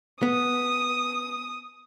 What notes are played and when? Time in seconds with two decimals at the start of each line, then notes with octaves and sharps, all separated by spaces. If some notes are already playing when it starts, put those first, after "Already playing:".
0.23 B3 D#6